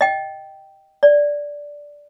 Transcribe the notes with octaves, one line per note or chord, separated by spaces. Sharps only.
D#5 G5
D5